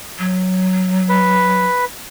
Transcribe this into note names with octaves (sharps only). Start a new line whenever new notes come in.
F#3
B4